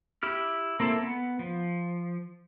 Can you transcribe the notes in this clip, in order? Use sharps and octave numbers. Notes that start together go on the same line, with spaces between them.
E4 G4 F6
A#3 C4 E4 A4
B3
F3